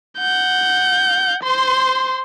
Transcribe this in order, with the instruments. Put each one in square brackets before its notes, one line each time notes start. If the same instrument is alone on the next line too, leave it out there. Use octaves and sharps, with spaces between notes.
[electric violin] F#5 G6
C5 C6